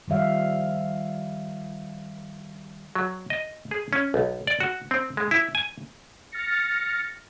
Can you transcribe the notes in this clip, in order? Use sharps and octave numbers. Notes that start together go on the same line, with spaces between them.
D#3 F3 G3 E5 F5
F#3
D#5
G#4
C#4
B1
D5
F#4
C4
G#3
E4
G#5
F6 A6 A#6 C#7